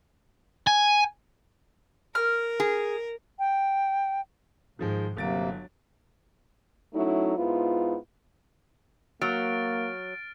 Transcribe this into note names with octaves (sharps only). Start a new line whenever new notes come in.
G#5
A#4 F6
G#4
G5
G#2 D#3 F3 G#3
G1 C3 F#3 A#3 A6 D7
F#3 A3 C#4 D#4 E4
G#2 B3 E4 F4
F#3 A#3 F6 A6 D7